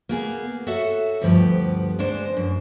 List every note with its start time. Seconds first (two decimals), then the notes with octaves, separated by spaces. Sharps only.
0.09 A#3 B3 G#4
0.67 F#4 A4 C#5 E5 F#5
1.22 D2 G2 F3 B3 G4
1.99 G#3 B3 D4 C5
2.37 F#2